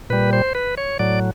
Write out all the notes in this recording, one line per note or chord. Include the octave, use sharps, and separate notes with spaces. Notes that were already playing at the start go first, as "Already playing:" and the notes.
A#2 G3 B4
C5
B4
C#5
A2 F#3 D5